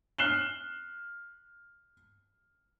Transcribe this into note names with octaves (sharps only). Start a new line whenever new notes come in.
F6 F#6 C7 E7 F#7 G7